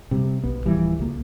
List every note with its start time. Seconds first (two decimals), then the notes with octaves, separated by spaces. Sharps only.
0.11 C3 G3
0.44 B1 B3
0.66 D1 E3 F3 G3
0.99 C#2 A#3